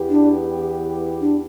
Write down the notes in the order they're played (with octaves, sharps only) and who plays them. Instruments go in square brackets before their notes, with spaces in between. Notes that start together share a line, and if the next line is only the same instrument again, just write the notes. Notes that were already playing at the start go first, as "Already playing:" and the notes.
Already playing: [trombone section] E2 E3 B3 G4
[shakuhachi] D4
D4